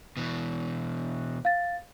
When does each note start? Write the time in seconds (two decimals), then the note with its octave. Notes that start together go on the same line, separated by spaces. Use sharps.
0.17 B2 E3
1.45 F5 A6